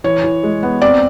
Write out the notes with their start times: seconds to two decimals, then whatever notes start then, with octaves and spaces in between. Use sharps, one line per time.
0.04 E3 C#5
0.24 E3
0.43 G#3
0.63 B3
0.82 C4 D5